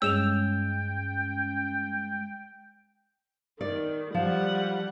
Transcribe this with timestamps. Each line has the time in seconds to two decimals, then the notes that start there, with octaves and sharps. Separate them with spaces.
0.02 G2 G#3 C#4 G5 E6 E7 F7
3.61 D#3 D5
4.14 F3 G3 F#5